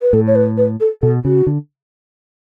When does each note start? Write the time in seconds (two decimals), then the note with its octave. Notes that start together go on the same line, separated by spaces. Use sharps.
0.02 B4
0.13 A2 A4
0.27 C#5
0.35 B4
0.57 B4
0.80 A4
1.02 B2 A4
1.24 C#3 F#4
1.47 D3